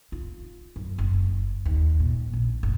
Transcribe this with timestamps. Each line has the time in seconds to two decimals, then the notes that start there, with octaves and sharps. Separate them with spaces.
0.12 F4
0.76 F#2
0.98 F#1
1.65 D#2
2.00 A#2
2.33 A#1
2.63 F#1